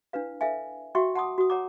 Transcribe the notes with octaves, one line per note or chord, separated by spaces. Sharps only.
D4 E4 B4 F5
A4 B4 E5 F5 G#5
F#4 E5 F5 G5 C6 C#6
F#5 A5 C6 D6 D#6
F#4 D#6
C#5 F#5 A#5 D6